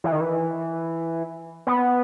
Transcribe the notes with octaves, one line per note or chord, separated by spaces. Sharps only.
E3
D#3
E3
B3